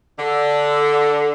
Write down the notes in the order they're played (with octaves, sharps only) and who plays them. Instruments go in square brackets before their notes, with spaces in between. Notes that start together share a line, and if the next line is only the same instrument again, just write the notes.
[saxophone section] D3